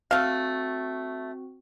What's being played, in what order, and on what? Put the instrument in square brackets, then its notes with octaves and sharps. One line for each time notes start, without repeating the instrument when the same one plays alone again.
[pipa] A3 F5 [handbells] C4 F#4